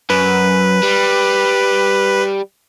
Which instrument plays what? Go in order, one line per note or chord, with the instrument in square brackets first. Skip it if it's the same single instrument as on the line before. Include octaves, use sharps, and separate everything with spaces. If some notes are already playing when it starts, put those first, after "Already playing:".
[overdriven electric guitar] F#2 [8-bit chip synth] B4
[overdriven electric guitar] G3